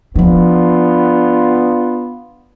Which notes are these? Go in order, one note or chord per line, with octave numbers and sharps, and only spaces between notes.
F3 B3 D4 E4 F4